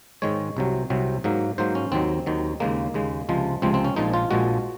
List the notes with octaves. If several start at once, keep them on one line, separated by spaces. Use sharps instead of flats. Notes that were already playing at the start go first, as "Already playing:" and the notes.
G#2 D#3 G#3 C#5
C2 C3 F#3
C2 C3 F#3
G#2 F#3 A#3
G#2 F#3 A#3 C5
C#4
D#2 D#3 F#3 C4
D#2 D#3 F#3
D#2 C#3 G#3 A#3
D#2 C#3 G#3
C#2 C3 F3 G#3
C#2 C3 F3 G#3 C4
C4
C#4
A#1 A#2 F3 G#3 D#4
F4
A#1 A#2 F3 G#3 F#4